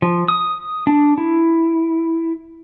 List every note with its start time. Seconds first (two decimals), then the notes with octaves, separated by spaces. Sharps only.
0.02 F3
0.28 D#6
0.87 D4
1.18 E4